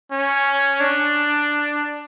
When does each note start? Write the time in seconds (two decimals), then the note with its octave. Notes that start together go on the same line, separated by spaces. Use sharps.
0.12 C#4
0.80 D4